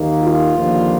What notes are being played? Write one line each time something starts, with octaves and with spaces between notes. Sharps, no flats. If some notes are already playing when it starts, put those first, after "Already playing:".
Already playing: D#2 D#3 A#3 D#4
F4
D#2 D3 F3 A#3